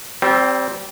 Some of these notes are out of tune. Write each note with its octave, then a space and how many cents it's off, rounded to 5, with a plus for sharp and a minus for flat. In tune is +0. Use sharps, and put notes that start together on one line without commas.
G3 -30 C4 +0